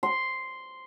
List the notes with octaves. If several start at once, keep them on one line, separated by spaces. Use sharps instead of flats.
C6